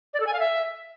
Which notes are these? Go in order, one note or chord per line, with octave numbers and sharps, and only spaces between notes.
D5
A4
G#5
F5
E5